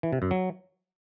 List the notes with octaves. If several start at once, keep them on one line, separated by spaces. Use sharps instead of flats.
E3
C3
F#2
F#3